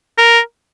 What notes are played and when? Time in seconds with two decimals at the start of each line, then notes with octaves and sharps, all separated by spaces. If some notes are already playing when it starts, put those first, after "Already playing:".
0.18 A#4